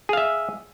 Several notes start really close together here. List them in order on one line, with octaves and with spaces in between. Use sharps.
G#4 F5 E5